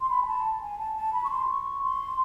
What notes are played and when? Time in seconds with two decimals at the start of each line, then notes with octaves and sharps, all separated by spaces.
0.01 C6
0.10 B5
0.22 G#5
0.27 A5
0.61 G#5
0.79 A5
0.95 A5
1.13 B5
1.24 C#6
1.31 C6
1.47 C#6
1.82 C6